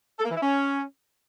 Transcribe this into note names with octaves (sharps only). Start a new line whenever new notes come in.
A4
A#3
E3
E4
C#4